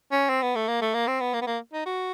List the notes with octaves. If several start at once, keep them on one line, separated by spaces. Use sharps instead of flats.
C#4
C4
B3
A3
A#3
A3
A#3
C4
B3
A#3
B3
A#3
D#4
F#4